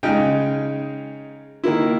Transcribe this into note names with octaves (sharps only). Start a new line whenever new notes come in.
C#3 G#3 D#4 G5
D#3 A#3 E4